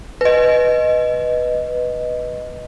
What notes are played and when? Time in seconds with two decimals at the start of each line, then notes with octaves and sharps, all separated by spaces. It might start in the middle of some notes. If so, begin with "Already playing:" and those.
0.21 B4 D#5